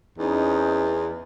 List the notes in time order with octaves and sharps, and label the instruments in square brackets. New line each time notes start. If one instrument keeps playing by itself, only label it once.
[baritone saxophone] E2 [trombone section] C4 C#4 D#4